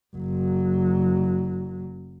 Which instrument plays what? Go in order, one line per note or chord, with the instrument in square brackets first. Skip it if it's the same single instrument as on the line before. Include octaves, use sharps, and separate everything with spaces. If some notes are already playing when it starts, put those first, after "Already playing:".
[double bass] F#1 F#3